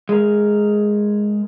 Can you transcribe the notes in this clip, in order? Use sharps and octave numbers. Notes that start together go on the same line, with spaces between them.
G#3 A#4